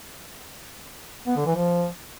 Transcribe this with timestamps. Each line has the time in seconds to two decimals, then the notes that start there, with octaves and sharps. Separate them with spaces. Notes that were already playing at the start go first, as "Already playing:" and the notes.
1.27 B3
1.37 D3
1.46 E3
1.56 F3